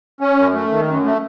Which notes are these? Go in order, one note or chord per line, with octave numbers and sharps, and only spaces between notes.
C#4
F#2
A3
D#3
F#2
A3